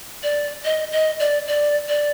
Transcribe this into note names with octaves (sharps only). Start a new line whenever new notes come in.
D5
D#5
D#5
D5
D5
D5